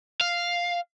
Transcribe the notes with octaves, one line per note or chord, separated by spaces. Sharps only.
F5